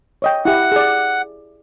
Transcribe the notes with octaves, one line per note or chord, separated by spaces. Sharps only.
C#5 D#5 G5
E4 G4 F#5
G#4 D5